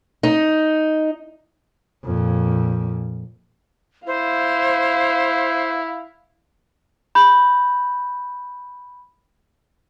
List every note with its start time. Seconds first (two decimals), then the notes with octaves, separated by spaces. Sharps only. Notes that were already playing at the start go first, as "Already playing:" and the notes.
0.23 D#4
2.05 F2 A#2
4.07 E4 C5 F5
7.15 B5 G6